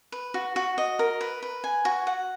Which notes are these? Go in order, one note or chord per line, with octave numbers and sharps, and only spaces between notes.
B4
F#4
F#4
D#5
A#4
B4
B4
G#5
F#4
F#5